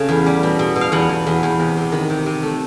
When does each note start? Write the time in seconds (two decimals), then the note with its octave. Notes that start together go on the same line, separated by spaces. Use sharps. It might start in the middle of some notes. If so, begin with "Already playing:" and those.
Already playing: C#3 A3 F5
0.09 E2
0.26 G3
0.43 B2
0.59 B2
0.76 B2
0.81 F5
0.92 E2 F#5
1.09 E2
1.26 E2
1.43 E2
1.59 C3
1.76 C3
1.92 D#3
2.10 C3
2.26 C3
2.43 A3